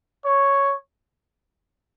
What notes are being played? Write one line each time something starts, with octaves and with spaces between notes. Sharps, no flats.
C#5